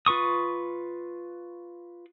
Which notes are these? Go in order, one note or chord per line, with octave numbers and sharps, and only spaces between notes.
F4 B4 C#6 D#6